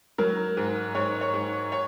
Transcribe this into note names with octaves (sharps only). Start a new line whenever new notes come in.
F#3 A#4
G#2
G#2 C#5
C#5
G#2
C#5